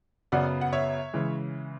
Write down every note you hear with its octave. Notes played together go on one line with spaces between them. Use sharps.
F#2 C#3 F#3 B3 D5 F#5
F#5
C#5 E5
C#3 E3 G#3